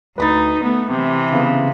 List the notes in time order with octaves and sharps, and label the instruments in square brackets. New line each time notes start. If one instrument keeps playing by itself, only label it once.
[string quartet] D2 D#4 [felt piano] B4 B5 A6
[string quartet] A3 B3
C3 E3
[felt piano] C#3 B3